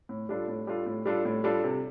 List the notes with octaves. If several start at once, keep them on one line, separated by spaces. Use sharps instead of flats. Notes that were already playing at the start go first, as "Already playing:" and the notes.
A2
G3 D4 F4 A4
A2
G3 D4 F4 A4
A2
G3 D4 F4 A4
A2
G3 D4 F4 A4
C3